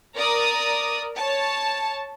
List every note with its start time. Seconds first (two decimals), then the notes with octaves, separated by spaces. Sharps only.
0.15 A#4 D5 D#6
1.18 C#5 A5